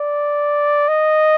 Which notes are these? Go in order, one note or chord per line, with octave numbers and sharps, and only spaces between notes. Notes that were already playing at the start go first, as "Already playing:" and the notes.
Already playing: D5
D#5